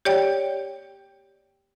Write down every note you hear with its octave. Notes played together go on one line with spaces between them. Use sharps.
G4 C#5 D5 G5